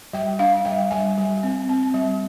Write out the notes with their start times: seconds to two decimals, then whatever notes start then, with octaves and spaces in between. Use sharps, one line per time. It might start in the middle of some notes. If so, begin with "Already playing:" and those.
0.13 G3 G5
0.39 D4 F5
0.65 G3 G5
0.91 G3 G#5
1.18 G3
1.43 C4
1.69 C4
1.94 G3